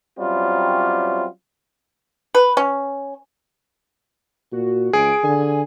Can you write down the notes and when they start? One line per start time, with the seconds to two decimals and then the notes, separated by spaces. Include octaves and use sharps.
0.18 F#3 G3 C4 C#4 E4 F4
2.35 B4
2.57 C#4
4.52 A#2 F#4
4.93 C#2 G#4 D7
5.23 D3 G#5